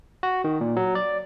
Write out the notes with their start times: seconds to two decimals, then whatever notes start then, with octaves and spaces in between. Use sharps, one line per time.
0.23 F#4
0.44 D#3
0.61 A#2
0.76 F#3
0.95 D5